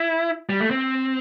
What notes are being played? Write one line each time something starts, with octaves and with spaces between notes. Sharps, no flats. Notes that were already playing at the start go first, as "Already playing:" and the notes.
Already playing: E4
G3
A3
C4